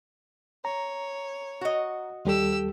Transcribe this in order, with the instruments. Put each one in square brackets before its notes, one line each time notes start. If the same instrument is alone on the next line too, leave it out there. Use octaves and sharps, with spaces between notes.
[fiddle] C#5 [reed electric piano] A#5
[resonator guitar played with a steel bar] F#4 D#5
[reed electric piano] D#2 G3 A4 [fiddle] G4 E6